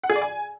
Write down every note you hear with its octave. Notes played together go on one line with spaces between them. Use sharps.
F#5
G#4
D5
G#5